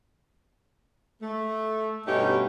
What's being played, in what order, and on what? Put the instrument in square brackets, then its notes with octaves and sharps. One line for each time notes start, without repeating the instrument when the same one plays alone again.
[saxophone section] A3
G2 B2 A3 C#4 D#4 G4